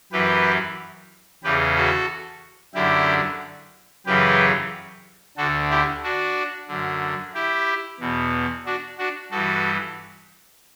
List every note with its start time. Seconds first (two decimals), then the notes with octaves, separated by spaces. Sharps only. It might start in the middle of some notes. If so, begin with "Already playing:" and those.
0.12 F#2 E3 G4 B4
1.44 E2 C#3 E3 G4 B4
1.76 F#4 A4
2.75 F#2 D3 E4 G4
4.06 F#2 C#3 E3 G4 B4
5.37 D2 D3 F#4 A4
5.70 E4 G4
6.03 D4 F#4
6.68 F#2 D3
7.34 E4 G4
8.00 E2 B2
8.66 D4 F#4
8.98 D4 F#4
9.31 G2 E3 F#4 A4